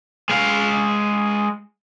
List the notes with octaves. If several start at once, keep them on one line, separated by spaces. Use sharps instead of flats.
G#3 F5